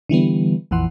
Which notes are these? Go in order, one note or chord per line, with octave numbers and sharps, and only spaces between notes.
D3 E3 G3 B3
A#1 F2 E3 F#5 C6